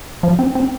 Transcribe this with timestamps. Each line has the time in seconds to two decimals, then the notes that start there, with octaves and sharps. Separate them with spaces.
0.23 F3
0.39 C4
0.55 C4